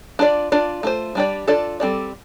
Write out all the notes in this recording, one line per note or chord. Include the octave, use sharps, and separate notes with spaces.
D4 F4 D5
D4 F4 D5
A3 F4 C5
G3 D4 G4 D5
D4 F4 A4 D5
G3 C4 A4 D5